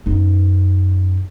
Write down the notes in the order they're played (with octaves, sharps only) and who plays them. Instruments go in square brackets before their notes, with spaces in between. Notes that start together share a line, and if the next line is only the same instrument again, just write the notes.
[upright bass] F#2 D#4